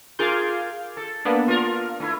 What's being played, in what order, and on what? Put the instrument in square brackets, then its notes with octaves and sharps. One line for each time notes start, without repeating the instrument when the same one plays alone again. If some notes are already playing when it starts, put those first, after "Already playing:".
[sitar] F4 G#4 A#4 [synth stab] F5 D6 G6
[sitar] A4
[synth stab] A#3 B3 D4
[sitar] F4 A#4
A3 E4